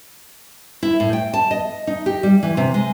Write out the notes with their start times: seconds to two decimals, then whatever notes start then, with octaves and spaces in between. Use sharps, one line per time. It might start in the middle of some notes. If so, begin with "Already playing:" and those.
0.83 E4
1.00 A2
1.13 G5
1.34 A5
1.51 D#5
1.87 D#4
2.06 G4
2.23 G3
2.43 E3
2.57 C3
2.74 G#3